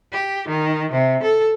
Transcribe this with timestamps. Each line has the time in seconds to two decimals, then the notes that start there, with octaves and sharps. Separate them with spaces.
0.12 G4
0.49 D#3
0.92 C3
1.23 A4